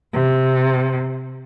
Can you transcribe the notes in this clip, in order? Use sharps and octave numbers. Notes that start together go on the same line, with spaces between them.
C3